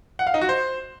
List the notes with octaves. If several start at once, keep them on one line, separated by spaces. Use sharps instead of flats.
F#5
F5
D#4
F#4
C5